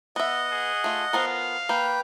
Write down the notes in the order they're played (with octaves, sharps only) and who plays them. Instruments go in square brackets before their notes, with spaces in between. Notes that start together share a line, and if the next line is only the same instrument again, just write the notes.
[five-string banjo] B3 E5 [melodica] D#5 F#5
[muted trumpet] G#4
[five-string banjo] A3 F4
[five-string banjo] F3 B3 A#4 [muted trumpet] F5
[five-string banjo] A#3 [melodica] B4 G5